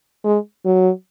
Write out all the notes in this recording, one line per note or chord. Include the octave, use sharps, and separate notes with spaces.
G#3
F#3